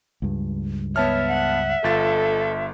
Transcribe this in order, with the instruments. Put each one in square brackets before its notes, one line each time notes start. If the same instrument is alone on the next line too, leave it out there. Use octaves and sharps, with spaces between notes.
[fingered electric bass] C#2 G2
[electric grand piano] B3 A5 F6 [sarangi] C#5 [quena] E5
[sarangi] F#5
[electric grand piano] G1 F4 A6 [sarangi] A4